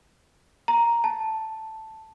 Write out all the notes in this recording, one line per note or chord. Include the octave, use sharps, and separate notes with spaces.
A#5
A5